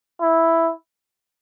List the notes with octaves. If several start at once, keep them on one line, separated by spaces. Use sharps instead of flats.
E4